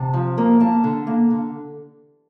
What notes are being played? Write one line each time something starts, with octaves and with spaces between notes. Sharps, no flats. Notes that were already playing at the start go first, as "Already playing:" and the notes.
Already playing: C3 A5
F3
A#3
A#3 A5
D3
A#3
D3